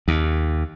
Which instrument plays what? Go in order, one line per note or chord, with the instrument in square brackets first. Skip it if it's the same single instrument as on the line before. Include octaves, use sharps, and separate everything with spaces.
[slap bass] D#2